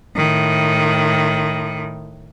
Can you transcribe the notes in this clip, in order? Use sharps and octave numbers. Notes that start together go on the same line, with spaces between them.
A2 D#3